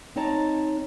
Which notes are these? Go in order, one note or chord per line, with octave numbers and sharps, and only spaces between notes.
C4 D#4 C#5 D#5 A5 A#5